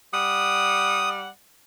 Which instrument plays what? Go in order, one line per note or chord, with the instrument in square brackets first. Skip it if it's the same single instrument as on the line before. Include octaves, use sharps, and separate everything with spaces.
[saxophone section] G3 D5 F#5 [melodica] D#6